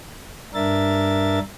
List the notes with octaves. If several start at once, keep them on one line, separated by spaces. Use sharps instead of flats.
G2 D4 A#4 E5 A6